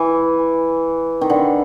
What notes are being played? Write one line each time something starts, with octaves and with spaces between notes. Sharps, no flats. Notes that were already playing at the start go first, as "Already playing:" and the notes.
Already playing: E3
D#3
D3